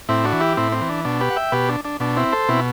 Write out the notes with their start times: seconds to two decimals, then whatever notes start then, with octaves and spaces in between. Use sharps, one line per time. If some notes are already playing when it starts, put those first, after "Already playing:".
0.09 A2 C4 E4
0.24 D4 F#4
0.32 E3
0.40 E4 G4
0.57 A2 C4 E4
0.72 C4
0.81 E3
0.89 D4
1.05 B2 D4
1.21 G4 B4
1.30 F#5
1.36 E5 G5
1.52 B2 G4 B4
1.69 D4
1.85 D4
2.00 B2 D4
2.17 C4 E4
2.32 A4 C5
2.48 B2 C4 E4